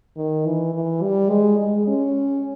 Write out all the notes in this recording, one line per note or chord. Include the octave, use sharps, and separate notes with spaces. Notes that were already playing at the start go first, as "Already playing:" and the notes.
D#3
E3
E3
G3
G#3
G#3
C#4